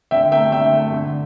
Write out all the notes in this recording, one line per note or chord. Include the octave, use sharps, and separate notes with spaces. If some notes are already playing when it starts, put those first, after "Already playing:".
D3 E5 G5
A3 E5 G5
D3 E5 G5
A3
D3